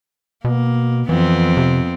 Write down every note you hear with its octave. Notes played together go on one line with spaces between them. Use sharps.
B2 A#3
F2 E3 B3 C4
C3